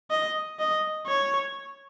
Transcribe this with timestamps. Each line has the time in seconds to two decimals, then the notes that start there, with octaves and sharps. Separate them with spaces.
0.11 D#5
0.59 D#5
1.07 C#5